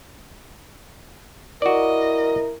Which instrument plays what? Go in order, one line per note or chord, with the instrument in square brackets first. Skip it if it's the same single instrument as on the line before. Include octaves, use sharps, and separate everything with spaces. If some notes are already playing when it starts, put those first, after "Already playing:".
[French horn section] E4 A#4 [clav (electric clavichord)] F#4 D5 [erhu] D#5